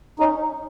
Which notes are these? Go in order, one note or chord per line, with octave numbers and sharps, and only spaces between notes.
C#4 D#4